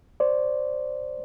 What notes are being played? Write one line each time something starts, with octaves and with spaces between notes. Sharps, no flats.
C5 D5